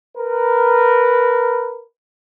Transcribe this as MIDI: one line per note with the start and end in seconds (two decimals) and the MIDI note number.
0.18 1.81 70
0.18 1.81 71